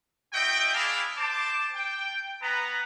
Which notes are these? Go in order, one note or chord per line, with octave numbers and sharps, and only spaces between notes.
E4 F#4 D#5 G5
D4 E4 G#4 D5 F5 A5
C5 A5 D6
G5
B3 B4 A#5